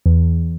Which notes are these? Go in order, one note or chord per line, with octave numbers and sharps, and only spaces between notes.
E2